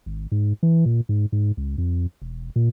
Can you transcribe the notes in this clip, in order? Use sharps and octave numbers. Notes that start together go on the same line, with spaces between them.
G#1
G#2
E3
A#2
G#2
G#2
C#2
F2
E1
A#2